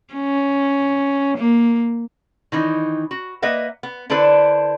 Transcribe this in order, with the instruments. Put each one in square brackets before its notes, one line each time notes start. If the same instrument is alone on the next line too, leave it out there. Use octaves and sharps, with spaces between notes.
[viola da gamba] C#4
A#3
[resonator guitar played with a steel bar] D#3 E3 D#4
F#4
A#3 B4 D#5 E5 F#5
B3
D3 D4 E4 A4 B4 C5